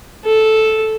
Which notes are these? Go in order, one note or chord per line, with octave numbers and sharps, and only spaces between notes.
A4